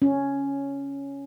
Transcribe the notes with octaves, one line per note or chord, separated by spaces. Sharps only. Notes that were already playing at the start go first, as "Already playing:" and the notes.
C#4